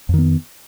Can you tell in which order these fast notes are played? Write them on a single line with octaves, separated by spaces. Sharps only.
F2 D#3 B3